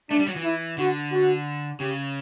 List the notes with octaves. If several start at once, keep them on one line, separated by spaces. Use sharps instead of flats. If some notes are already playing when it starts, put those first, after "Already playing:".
A3 D4
G3
F#3
E3
E4
D3 F#4
F#4
C#3 G4